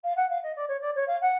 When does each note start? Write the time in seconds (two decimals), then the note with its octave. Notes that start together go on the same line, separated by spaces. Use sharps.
0.04 F5
0.16 F#5
0.29 F5
0.43 D#5
0.56 D5
0.68 C#5
0.81 D5
0.95 C#5
1.07 F5
1.21 F#5